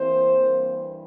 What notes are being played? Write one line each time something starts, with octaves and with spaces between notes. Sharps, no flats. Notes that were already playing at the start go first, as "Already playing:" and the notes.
Already playing: C3 E3 A#3 C4 C5
G2 E3 A#3